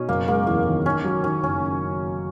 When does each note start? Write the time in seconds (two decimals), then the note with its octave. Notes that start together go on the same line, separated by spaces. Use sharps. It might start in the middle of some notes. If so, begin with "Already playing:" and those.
Already playing: B2 C#4 D#4
0.09 F#1 A#3
0.28 G#3 A#3
0.47 E2 A#3
0.66 D#3
0.86 D#3 C#4
1.04 F#3
1.24 D#3 C#4
1.43 F#1 C#4